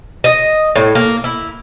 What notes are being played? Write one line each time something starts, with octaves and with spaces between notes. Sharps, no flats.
D#5
A2
A#3
E4